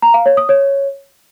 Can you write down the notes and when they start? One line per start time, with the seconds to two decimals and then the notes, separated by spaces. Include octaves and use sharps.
0.02 A#5
0.14 F5
0.26 C#5
0.37 D#6
0.49 C#5